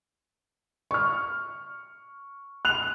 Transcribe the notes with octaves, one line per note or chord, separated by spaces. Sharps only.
C#6 F6
F#6 F7